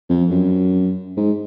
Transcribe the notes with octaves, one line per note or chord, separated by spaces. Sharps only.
F2
F#2
G#2